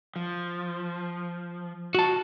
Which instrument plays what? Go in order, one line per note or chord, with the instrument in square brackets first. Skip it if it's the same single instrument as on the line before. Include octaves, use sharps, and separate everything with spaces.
[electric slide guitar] F3
[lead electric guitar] F#4 A5